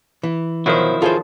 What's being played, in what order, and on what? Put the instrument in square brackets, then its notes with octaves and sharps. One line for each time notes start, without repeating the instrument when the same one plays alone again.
[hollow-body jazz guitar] E3
[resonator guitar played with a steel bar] B2 C5 [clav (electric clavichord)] D#3 F3 F#3 [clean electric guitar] E4
[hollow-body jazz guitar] F4 G#4 C5 [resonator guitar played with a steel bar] A4